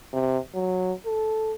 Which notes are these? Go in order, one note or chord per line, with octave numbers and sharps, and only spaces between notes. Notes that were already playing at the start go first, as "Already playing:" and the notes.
C3
F#3
A4